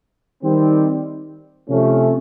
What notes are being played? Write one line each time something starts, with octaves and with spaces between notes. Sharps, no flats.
D#3 G3 C4
C3 F3 A3 C#4